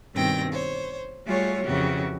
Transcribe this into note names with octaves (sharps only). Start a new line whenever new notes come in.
G2 B2 D#3 C4 G5 A#6
C5 C#5
G3 A3 F4 F#4 G#4 C#5
F2 C#3 E3 F#4 G4